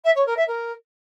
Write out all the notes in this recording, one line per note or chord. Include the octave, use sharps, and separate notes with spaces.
E5
C#5
A#4
E5
A#4